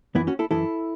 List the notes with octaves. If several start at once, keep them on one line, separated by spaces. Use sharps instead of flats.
F#2 E3 B3 E4
C#4 F#4
E4 A4
F#2 E3 E4 A4